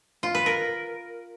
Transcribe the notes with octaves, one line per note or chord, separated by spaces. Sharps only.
F4
B4
A#4